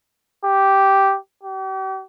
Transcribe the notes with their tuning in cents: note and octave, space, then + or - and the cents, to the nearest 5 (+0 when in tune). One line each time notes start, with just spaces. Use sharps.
G4 -5
G4 -40